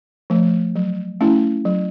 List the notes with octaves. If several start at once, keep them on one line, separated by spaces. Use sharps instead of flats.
F3 A3
F#3
A3 C#4 E4
F#3